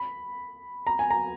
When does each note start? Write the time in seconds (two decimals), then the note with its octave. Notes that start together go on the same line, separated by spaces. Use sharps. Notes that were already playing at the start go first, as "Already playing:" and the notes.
Already playing: B5
0.87 A#5
0.99 G#5
1.10 A#5